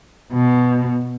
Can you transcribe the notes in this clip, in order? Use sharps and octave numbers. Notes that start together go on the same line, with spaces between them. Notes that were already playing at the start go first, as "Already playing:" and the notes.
B2